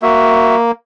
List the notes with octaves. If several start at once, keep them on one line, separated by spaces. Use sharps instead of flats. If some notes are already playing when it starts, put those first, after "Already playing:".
A#3 F#4 E5